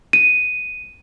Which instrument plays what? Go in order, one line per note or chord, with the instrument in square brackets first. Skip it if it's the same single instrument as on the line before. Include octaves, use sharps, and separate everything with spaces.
[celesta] D#7